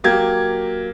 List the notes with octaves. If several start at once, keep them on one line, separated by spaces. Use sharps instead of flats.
F#3 A#3 G4 G#6